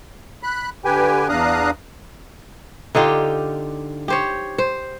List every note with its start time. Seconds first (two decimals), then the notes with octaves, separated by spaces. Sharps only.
0.43 B5 F#6
0.85 D3 G4 B4 G5 G#5
1.29 E2 D4 F5 A#5 D#6 F#6
2.95 D3 D#4 F4 G4
4.08 G4 C5 C#5
4.58 C5